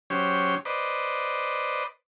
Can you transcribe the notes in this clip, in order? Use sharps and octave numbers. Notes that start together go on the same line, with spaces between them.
F#3 C#4 G4 C5 C#5
B4 C5 D5 D#5